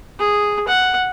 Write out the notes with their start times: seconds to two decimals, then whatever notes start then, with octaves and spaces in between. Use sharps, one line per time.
0.20 G#4
0.68 F#5